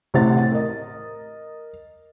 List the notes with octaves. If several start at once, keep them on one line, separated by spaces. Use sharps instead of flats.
A1 C3 A3 C5 F#5 A6
A#4 D#5